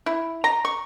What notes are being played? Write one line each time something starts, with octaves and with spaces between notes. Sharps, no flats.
E4
A#5
C#6